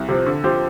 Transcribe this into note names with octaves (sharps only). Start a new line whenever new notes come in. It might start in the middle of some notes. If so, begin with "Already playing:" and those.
Already playing: C2
C3 F3 C4
D3
F3 C4 G4 C5